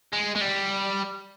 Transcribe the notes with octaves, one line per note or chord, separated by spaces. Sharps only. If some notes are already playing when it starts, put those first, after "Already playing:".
G#3
G#3
G3